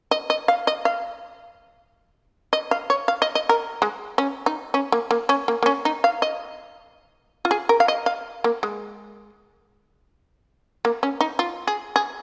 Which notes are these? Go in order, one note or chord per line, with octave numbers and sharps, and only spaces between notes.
D#5
D#5
F5
D#5
F5
D#5
F5
C#5
F5
D#5
D#5
A#4
G#3
C#4
D#4
C#4
A#3
A#3
C#4
A#3
A#3
C#4
D#4
F5
D#5
F4
G#4
A#4
F5
D#5
F5
A#3
G#3
A#3
C#4
D#4
F4
G#4
G#4